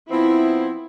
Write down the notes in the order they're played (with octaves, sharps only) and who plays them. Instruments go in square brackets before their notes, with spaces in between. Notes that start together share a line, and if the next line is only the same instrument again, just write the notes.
[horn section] F3 B3 C4 [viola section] E4